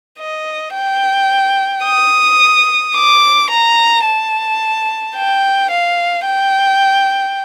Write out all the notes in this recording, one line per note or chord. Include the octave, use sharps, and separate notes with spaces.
D#5
G5
D#6
D6
A#5
A5
G5
F5
G5